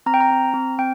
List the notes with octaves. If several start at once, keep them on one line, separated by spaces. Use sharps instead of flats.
C4 A#5
G5
A#5
C4
C4
C4 G5